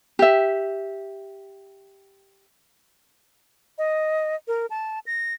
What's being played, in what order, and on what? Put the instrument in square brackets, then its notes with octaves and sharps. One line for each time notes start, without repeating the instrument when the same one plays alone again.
[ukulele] G4 E5
[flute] D#5
A#4
A5
A#6